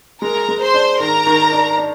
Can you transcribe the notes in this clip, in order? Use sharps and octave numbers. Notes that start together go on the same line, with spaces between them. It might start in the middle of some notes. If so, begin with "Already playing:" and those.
G#3 A#4 A#5
G#3
C5 C6
D4
D#3 A#4 A#5
D#3
D4
D4